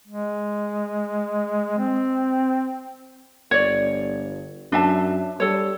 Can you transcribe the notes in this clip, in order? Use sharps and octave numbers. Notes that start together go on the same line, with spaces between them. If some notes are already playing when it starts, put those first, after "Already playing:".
G#3
C4
G1 C#5 D5
F#2 D4 E5 A5
G3 A4 C#5